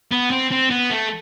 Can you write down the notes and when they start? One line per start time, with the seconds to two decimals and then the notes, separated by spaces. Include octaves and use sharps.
0.12 B3
0.31 C4
0.51 C4
0.71 B3
0.91 A3